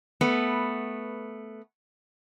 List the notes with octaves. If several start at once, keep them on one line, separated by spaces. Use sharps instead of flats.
A3 B3 B4